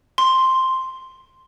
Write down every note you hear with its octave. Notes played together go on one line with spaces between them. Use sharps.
C6